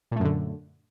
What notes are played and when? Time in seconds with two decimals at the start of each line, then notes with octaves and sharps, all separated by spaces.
0.11 A#2
0.16 A3
0.20 F#2
0.24 D3